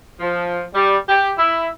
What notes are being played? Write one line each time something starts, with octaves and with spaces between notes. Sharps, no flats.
F3
G3
G4
E4